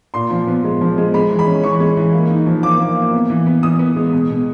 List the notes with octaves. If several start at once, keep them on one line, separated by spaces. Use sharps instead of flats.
A#2 C6
F3
B3
G#3
F3
G#3
G#3 B5
E3
B5
C#4
E3 C#6
G#3
E3
A#3
D#4
F3
A#3 D6
A#3
A#3
B3
E3
B3
E3 D#6
B3
G#3
B2
B2